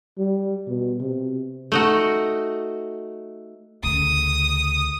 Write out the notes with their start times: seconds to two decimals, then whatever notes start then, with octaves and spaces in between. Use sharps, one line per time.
0.18 G3
0.68 B2
1.00 C3
1.72 A3 D#4 F#4
3.83 D2 C#3 D#6